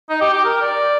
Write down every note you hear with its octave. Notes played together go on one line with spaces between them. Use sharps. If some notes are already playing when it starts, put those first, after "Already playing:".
D#4
G4
G4
A#4
D5